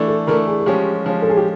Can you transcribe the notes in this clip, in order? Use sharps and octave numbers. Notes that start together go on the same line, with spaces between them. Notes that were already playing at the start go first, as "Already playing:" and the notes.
Already playing: E3 A3 D4
A4
E3 A3 D4 A#4
G#4
G#4
F3 G#3 C#4 G4
F3 G#3 C#4
A4
G#4
G4